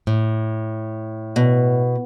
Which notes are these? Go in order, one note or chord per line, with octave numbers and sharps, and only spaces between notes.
A2
B2